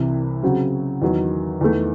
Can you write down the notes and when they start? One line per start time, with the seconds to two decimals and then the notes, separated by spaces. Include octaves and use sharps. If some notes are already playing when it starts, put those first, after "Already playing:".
Already playing: C2 C3 E3
0.43 C#3 F#3 C4 F#4
1.02 E2 D#3 F#3
1.61 E2 D#3 A3